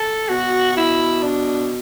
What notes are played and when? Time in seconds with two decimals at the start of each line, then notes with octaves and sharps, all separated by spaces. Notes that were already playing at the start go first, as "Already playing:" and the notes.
Already playing: A4
0.29 B2 F#4
0.77 E4
1.23 D4